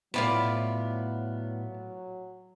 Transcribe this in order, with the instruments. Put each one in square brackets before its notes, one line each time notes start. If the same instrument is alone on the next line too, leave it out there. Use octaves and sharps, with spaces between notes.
[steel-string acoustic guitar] A2 B3 [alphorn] F#3 [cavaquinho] F4 D5 B5